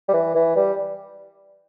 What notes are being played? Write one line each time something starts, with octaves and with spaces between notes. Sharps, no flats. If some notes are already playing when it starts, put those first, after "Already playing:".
G3
E3
E3
G3